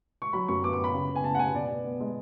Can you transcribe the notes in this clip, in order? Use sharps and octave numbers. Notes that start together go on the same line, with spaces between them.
C#6
F#3 B5
F#2 C#6
B3 D6
D6
B3 B5
C#3
B3
G#5
C#3 A5
F#5
B3 G#5
B2 D5
B3
B3
G#3